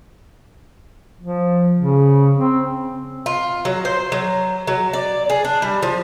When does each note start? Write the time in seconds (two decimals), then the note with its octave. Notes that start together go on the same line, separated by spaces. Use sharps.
1.20 F3
1.77 C#3
2.36 C4
3.26 F4
3.65 F#3
3.85 C5
4.12 F#3
4.67 F#3
4.93 D5
5.30 G#4
5.45 D4
5.62 G3
5.83 F3